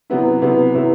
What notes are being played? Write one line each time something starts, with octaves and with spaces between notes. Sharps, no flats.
C3 F#3 B3 E4
C3 F#3 B3 E4
C3 F#3 B3 E4